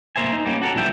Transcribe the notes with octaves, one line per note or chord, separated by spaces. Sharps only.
A#3 A#4 C5 E5 G#5
D#4
G3 A#3 C4 C#4
F#4 A4 A#4
C2 A#2 D3 E3 E5 G5